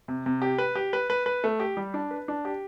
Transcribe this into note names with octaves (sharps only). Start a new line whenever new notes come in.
C3
C3
G4
B4
G4
B4
B4
B4
A3
G4
G3
D4
B4
D4
G4